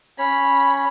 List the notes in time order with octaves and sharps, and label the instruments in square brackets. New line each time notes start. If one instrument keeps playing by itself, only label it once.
[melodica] C#4 C#5 [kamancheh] B5